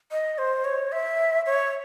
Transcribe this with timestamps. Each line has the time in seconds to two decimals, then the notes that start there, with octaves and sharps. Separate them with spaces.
0.11 D#5
0.38 C5
0.64 C#5
0.92 E5
1.46 C#5